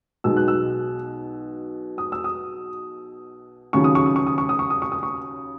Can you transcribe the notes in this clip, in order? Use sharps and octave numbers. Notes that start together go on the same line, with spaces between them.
B1 B2 G#3 E6
F#6
E6
D#6
E6
D#6
D#2 C#3 F#3 C#6
D#6
C#6
D#6
C#6
D#6
C#6
D#6
C#6
D#6
C#6
D#6
C#6